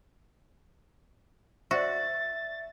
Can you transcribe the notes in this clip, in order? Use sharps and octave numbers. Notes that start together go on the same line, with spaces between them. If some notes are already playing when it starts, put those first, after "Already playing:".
F#4 C5 D5 E5 A6